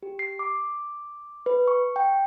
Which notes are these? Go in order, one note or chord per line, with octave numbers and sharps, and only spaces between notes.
G4
C7
D6
B4
C#6
G5